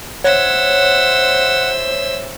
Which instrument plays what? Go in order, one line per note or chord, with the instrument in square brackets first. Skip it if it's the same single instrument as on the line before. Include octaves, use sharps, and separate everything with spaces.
[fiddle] C5 E5 [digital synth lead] C#5 [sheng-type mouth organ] F#5